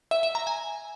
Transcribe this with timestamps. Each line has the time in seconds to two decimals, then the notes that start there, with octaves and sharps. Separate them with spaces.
0.11 E5
0.23 E5
0.35 A#5
0.47 G#5